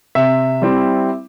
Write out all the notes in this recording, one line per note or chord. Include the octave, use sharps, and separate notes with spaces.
C3 E5
G3 C4 E4